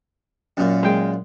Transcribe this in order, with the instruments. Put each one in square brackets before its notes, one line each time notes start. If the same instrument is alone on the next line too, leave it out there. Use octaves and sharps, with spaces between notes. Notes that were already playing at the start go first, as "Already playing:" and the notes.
[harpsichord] F#2 A#2
[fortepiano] G#3 G5